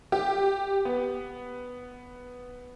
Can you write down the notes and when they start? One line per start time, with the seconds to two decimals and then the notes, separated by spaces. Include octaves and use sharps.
0.12 G4
0.85 B3